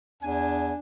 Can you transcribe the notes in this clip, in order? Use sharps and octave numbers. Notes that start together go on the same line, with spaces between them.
E2 D4 G#5